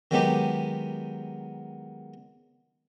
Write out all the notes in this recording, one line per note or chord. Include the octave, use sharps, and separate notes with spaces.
D#3 F#3 G#3 B3 D#4 G4